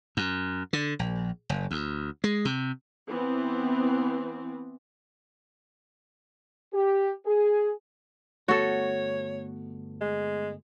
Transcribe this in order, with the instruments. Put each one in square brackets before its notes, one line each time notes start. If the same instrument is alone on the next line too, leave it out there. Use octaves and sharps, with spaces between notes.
[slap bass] F#2
D3
A#1
F#1
D2
G#3
C3
[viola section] E3 B3 C4
[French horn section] G4
G#4
[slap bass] G1 A3 B3 [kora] F#4 A4 [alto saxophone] C#5
[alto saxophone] G#3